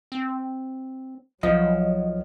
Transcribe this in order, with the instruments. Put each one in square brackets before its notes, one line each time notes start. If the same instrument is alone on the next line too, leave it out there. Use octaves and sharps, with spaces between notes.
[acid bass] C4
[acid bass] B1 [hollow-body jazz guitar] F3 [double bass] F#3 [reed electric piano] D#5